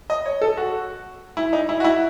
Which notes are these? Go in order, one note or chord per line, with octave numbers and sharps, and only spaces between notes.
D#5
C#5
A4
F#4
E4
D#4
E4
F#4
E4